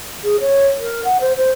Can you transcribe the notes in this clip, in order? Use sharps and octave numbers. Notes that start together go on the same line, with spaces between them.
G#4
C#5
A#4
F#5
C5
C5